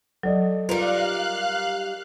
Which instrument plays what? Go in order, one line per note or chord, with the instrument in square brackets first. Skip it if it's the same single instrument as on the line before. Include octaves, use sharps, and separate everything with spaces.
[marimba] F#3 [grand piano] A4 D5 D#5
[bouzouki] G3 D#4 A#4 [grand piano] F4 B4 [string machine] F5 F#6